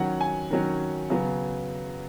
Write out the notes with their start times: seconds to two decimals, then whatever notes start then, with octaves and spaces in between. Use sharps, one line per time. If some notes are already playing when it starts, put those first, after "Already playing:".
Already playing: D#3 F#3 C#4 F#5
0.21 G#5
0.51 D#3 F#3 C#4
1.10 C#3 F#3 B3